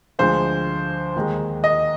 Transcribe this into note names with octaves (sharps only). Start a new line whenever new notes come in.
D2 D3 F3 G#3 C5
D#2 D#3 G#3
D#5